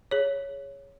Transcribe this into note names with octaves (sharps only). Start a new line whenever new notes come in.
G#4 C#5